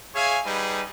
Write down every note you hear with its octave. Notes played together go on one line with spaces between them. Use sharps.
G#4 C#5 E5 F5 G#5
G3 D#4 G#4 B4